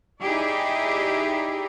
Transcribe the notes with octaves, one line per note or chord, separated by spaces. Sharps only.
D#4 E4 G4 G#4 D5